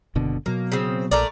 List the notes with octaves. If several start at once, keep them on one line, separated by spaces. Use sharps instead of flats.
F#1 B2 D3
B2 F#3 A#3
C#3 C4
A#1 A3 A#4 D5